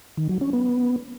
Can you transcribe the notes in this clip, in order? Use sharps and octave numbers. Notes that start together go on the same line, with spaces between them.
D#3
F#3
C#4
B3